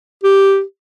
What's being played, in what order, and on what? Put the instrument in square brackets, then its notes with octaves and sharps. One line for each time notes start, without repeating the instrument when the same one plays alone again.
[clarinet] G4